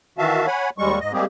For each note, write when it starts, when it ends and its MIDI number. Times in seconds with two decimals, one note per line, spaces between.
0.18 0.47 51
0.18 0.47 52
0.18 0.47 66
0.18 0.47 76
0.18 0.47 77
0.18 0.47 81
0.47 0.70 73
0.47 0.70 78
0.47 0.70 80
0.47 0.70 83
0.78 0.99 39
0.78 0.99 55
0.78 0.99 56
0.78 0.99 85
1.00 1.12 44
1.00 1.12 75
1.13 1.25 55
1.13 1.25 56
1.13 1.25 58
1.13 1.25 60
1.13 1.25 67
1.13 1.25 68